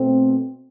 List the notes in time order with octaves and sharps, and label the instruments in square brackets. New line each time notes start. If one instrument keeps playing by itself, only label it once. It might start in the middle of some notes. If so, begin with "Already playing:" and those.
Already playing: [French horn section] B2 A3 C4